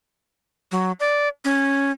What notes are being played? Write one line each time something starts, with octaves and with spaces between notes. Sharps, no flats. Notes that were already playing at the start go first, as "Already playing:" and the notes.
F#3
D5
C#4